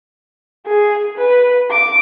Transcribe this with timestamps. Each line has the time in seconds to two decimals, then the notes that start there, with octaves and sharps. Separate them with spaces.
0.67 G#4
1.17 B4
1.71 D6